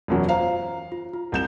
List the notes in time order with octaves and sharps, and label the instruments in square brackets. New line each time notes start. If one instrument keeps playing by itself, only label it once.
[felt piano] E1 F#2 F#3
[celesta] F4 C5 A#5 [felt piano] F5
[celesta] F4
F4
[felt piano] C2 G6 E7